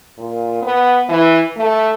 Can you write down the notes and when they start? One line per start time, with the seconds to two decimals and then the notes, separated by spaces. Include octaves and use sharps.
0.18 A#2
0.62 B3
1.09 E3
1.57 A3